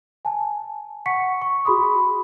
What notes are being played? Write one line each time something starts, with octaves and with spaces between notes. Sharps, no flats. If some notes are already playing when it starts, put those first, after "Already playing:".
G#5 A5
F#5 C#6 B6 C#7
C#6
F#4 G#4 B5 C6 D#6